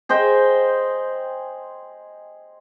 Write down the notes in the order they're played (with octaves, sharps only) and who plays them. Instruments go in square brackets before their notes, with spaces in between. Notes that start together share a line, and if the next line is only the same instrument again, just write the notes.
[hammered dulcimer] G#4 C5 D#5 G5